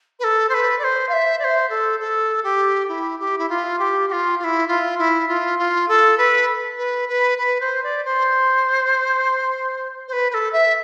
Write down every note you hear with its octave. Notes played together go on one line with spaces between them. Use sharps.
B4
A4
C5
B4
D5
C5
F5
E5
D5
C5
A4
A4
G4
E4
G4
E4
F4
G4
G4
F4
F4
E4
F4
E4
F4
F4
A4
B4
B4
B4
B4
C5
D5
C5
C5
B4
B4
A4
E5